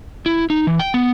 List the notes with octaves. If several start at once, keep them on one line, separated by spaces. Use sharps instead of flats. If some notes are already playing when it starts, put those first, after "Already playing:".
E4
D#4
E3
G5
B3